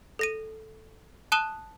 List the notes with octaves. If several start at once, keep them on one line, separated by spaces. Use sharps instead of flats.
A4 A#6 D#7
A5 D#6 F#6 E7 G7